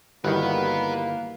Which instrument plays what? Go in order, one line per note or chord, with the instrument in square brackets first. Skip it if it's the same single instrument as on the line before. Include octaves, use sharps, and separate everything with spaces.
[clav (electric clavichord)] G1 D#3 [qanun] G3 E4 F#4 [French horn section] A#3 [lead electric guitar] B4 F#5